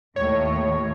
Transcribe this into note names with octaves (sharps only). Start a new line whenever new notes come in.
D#2 A2 C#5